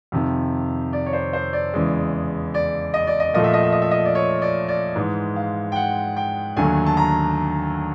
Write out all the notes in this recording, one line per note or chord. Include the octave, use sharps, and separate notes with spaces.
F2 C3 D#3
D5
C#5
C5
C5
D5
E2 C#3 E3 G#3
D5
D#5
D5
D#5
A#2 F3 A3 D#5
E5
D#5
E5
D#5
E5
D#5
D5
C#5
D5
D5
G#2 E3 G#3
F5
G5
F#5
G5
D#2 D3 F#3 A3 G#5
A5
A#5